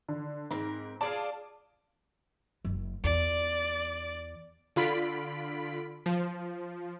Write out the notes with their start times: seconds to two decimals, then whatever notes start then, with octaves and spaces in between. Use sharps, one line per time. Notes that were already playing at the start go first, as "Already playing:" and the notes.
0.09 D3
0.51 G#2 C4 A#4
1.01 F4 G#4 D5 A5
2.65 F#1 F#2
3.04 E2 D5
4.76 D3 F4 B5 B6 D7
6.06 F3